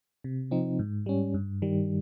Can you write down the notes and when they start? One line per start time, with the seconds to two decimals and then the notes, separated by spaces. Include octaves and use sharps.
0.24 C3
0.51 F3 C4 D#4
0.79 G#2
1.06 G3 C#4
1.34 G2
1.62 D#3 G3